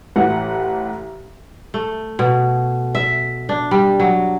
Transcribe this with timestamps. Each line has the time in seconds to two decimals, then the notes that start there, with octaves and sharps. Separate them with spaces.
0.16 A1 E3 F#5
1.74 A3
2.19 B2
2.95 E5
3.49 D4
3.71 G3
4.00 F#3